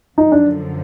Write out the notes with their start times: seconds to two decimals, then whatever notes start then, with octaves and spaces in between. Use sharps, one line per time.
0.18 F#2 D3 F3 D#4
0.32 D4